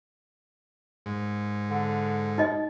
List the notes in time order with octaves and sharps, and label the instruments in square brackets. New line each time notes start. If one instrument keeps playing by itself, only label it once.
[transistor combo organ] G#2
[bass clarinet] D3
[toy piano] D#4 D#5